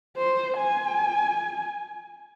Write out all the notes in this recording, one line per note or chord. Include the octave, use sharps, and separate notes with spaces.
C5
G#5